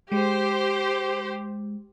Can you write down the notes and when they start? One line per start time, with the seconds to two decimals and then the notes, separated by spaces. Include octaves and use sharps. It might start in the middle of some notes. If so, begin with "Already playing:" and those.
0.12 G#3 G4 C5